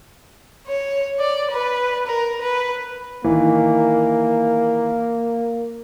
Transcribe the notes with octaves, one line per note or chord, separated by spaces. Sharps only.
C#5
D5
B4
A#4
B4
D#3 E3 A#3